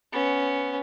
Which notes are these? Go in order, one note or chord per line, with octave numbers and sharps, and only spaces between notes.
B3 C#4